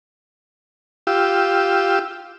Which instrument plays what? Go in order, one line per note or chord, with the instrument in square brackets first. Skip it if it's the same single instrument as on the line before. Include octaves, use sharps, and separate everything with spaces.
[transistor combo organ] F4 G4 E6